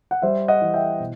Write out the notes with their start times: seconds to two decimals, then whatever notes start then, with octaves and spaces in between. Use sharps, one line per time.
0.11 F#5
0.22 G3 C5 E5
0.48 D#5 F#5
0.61 E3
0.74 E5 G5
1.00 B2